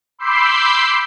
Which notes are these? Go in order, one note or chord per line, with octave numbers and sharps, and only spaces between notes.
B5 C6 D6 E6 G6 C7